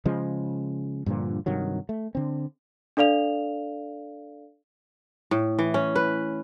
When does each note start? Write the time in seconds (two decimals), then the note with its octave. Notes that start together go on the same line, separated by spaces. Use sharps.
0.05 C#3 F3 G#3
1.06 G2 A#2 D3 F3
1.46 G2 C3 D#3 F#3
1.89 A3
2.15 D3 C4
2.97 D4 A4 D5 F5 F7
5.31 A2
5.59 E3
5.74 C#4
5.95 B4